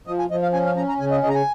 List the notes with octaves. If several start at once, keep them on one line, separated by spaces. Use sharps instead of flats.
F3 D#5
G#5
F3 D#5
F5
C#4 G#5
F5
C#4 A#5
A#5
C#3 G#5
D#5
C#3 D#5
A#5
G#5